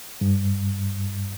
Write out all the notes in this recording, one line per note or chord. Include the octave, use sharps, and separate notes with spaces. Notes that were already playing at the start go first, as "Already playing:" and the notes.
G2